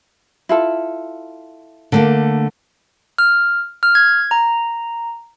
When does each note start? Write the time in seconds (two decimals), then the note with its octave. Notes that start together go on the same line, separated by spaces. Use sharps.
0.49 E4 F4 A4
1.92 D3 A3 A#3
3.18 F6
3.83 F6
3.95 G#6
4.31 A#5